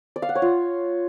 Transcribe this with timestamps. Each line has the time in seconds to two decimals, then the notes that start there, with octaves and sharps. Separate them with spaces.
0.16 D5
0.22 F5
0.29 F#5
0.35 C#5
0.42 F4